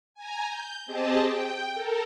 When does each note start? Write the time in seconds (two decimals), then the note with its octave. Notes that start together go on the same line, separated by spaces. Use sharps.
0.14 G#5 A#5
0.46 G6
0.86 C4 G4 G#4 D#5 A5
1.20 G5
1.74 A4 A#4